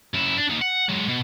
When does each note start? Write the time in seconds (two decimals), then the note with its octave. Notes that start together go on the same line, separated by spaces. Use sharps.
0.14 F#2 E4
0.37 D4
0.49 D#2 D#4
0.62 F#5
0.89 F#3 G#3
1.09 B2